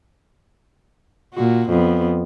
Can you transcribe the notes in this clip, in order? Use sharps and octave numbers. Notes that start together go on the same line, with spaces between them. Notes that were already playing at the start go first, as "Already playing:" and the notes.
A#2 F#4
F2 B3